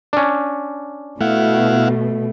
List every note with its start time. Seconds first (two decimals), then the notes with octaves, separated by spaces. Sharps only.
0.13 C#4 D4
1.21 B2 A3 E4 F5 F#5